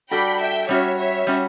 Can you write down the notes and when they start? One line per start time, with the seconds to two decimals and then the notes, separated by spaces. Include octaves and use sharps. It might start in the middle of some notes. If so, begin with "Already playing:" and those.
0.11 G3 D4 F#4 A4 G5 B5
0.40 E5 G5
0.69 G3 C#4 F#4 C#5 E5
0.98 C#5 E5
1.27 G3 C#4 F#4